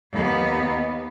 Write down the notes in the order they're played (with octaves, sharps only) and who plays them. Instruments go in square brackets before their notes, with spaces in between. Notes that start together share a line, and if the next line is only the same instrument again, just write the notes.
[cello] D#2 B3